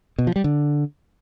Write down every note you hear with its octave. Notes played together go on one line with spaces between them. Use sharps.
B2
F3
G3
D3